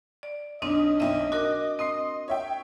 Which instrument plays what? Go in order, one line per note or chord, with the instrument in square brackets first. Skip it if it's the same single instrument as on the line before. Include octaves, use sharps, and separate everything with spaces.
[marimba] D5
[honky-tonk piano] B1 [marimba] C4 D4 D#4 [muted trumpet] D#5
[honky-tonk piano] B1 C4 D#7 [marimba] E5 D#6
[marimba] F#4 A#4 [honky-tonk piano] D6
[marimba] C4 [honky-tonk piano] C6 D#6 C7
[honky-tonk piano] C#5 E5 G5